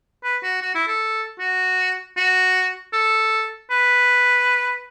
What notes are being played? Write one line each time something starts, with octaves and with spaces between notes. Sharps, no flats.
B4
F#4
F#4
E4
A4
F#4
F#4
A4
B4